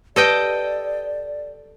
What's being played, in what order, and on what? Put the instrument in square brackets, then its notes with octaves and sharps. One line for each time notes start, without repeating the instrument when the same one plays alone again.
[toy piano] G4 B4 [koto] A4 D#5 G5 [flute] D5